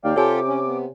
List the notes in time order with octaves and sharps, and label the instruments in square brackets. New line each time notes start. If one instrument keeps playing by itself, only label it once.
[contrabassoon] D#2 [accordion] D5 F5 G5
[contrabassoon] C3 [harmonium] F4 G4 A4 [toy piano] C#5 G#5 [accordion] D6
[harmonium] C#4
B3